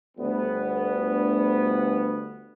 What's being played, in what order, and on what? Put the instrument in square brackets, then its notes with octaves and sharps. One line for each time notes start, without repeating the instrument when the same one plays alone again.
[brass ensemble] G1 D2 B3